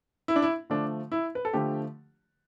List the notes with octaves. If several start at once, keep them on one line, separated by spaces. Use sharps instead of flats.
E4
D4
E4
D3 F3 A3 D4
E4
B4
A4
D3 F3 A3 G4